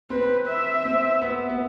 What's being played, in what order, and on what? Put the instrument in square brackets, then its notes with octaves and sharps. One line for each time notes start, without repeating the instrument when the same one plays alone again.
[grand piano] C4 [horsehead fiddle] B4
[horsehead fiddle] E5
[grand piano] C4
B3
B3